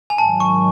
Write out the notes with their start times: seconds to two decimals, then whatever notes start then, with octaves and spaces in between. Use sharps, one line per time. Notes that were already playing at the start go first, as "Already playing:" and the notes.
0.10 G#5
0.18 G#2 D#3 F#3 A5
0.40 C#6